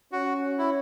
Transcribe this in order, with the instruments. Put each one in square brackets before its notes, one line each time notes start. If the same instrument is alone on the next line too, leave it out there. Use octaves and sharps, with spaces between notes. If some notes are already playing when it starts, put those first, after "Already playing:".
[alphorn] C#4 [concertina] F#4
[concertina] E4